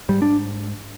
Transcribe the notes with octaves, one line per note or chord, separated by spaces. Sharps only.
G#2 G3
D4